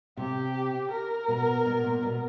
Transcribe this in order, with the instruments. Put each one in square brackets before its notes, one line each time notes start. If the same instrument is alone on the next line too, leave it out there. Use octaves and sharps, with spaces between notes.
[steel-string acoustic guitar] C3 [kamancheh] G4
[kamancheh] A#4
[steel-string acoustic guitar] B2
B2
A#2
B2